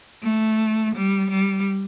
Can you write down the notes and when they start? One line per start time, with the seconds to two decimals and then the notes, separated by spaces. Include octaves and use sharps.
0.24 A3
0.95 G3
1.31 G3